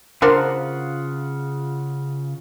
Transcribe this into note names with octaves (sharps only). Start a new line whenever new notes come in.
C#3 D4 F4 A#4 C5 F#5